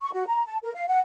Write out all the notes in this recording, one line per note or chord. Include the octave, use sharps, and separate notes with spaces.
C#6
F#4
A#5
A5
A#4
F5
F#5